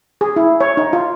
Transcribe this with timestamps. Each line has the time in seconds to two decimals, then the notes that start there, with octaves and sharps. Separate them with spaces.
0.21 G#4
0.36 E4
0.60 C#5
0.77 D#4
0.93 F4